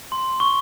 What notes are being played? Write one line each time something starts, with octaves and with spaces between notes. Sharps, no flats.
C6
C#6